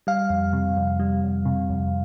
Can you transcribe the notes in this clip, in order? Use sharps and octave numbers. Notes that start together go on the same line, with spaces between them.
G3 F5
F2
C3
F2
G3
F2
C3
F2